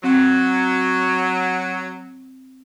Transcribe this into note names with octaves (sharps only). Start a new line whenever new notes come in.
F#3 C4